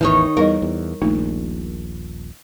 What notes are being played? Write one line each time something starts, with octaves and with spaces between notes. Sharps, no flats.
A1 E2 D#3 E3 D#4 C#5
E2 G3 D#4 A#4 D#5
E2
D#1 A#1 A3 D#4